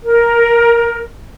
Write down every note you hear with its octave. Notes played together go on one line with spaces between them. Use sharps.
A#4